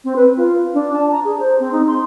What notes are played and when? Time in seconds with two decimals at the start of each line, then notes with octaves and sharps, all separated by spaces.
0.04 C4
0.16 B4
0.37 F4
0.74 D4
0.93 A5
1.12 A#5
1.25 G#4
1.39 C5
1.60 C4
1.72 D#4
1.88 C6